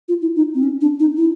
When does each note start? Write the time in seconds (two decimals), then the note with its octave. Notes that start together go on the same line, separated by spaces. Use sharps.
0.09 F4
0.22 E4
0.36 D#4
0.55 C4
0.63 C#4
0.81 D4
1.00 D#4
1.17 E4